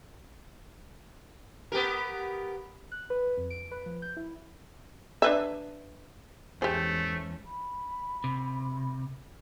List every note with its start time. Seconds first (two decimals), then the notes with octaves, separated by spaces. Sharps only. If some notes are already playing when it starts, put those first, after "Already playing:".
1.72 B3 G4 A#4
2.92 F#6
3.10 B4
3.37 F2
3.50 D7
3.71 B4
3.86 F3
4.02 G6
4.17 E4
5.22 D4 B4 E5
6.62 E2 G#2 A3 C#4 G4 G#4 C5
7.46 B5
8.24 C3